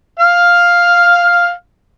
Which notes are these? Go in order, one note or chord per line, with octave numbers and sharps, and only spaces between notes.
F5 F6